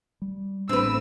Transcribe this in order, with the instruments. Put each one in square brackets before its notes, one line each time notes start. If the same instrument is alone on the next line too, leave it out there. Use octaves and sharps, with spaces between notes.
[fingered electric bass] G3
[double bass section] A1 A3 B3 [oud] C4 B4 [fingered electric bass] D4 [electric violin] E6